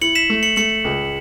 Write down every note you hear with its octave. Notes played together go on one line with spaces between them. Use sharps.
E4 C#7 F#7
B6 E7
A3
C#7 F#7
A3 C#7 F#7
C#2